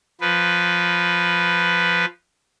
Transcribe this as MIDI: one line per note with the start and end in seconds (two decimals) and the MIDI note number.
0.21 2.05 53
0.21 2.05 71